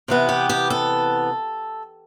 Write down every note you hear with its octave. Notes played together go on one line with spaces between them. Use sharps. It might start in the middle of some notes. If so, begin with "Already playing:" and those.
C3 E3 B3
G4
G4
A4